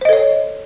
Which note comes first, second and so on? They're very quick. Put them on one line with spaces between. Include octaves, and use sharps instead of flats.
C5 D#5 A4 C#5